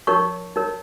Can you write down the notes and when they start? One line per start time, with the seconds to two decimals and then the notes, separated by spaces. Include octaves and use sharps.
0.07 D#4 A#4 C#5 C#6
0.56 D#4 A#4 C#5